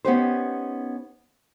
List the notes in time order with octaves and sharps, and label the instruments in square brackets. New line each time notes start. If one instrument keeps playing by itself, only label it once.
[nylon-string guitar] B3 C#4 D#4 G4 B4 C5